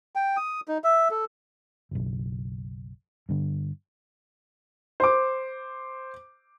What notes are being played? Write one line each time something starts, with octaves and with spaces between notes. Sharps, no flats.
G5
D#6
D#4
E5
A4
F#1 B1
G2 D3
C5 D6